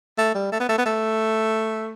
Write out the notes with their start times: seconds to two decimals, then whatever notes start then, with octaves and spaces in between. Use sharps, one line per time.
0.18 A3
0.35 G3
0.52 A3
0.60 B3
0.69 A3
0.78 B3
0.86 A3